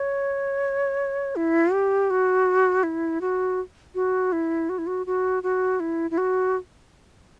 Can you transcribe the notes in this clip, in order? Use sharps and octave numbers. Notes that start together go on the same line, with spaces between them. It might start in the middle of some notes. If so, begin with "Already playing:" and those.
Already playing: C#5
E4
G4
F#4
E4
F#4
F#4
E4
F#4
E4
F#4
F#4
F#4
E4
E4
F#4